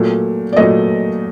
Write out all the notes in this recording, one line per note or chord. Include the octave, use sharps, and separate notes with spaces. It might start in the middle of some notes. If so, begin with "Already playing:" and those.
Already playing: A#2 F#3 A3
D5
A#2 F#3 A3 D#5